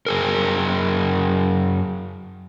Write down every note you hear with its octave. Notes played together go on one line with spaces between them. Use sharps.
F#2 G#4 A#4